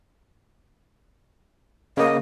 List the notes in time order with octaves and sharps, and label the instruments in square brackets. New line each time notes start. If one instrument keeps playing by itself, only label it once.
[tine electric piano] C#3 A#3 [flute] D#5